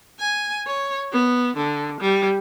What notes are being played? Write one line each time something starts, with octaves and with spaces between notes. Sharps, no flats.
G#5
C#5
B3
D3
G3